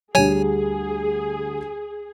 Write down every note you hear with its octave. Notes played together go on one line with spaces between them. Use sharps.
D2 G3 G#4 C#5 G#5